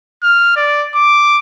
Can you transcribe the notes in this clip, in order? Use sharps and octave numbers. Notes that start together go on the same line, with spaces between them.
F6
D5
D6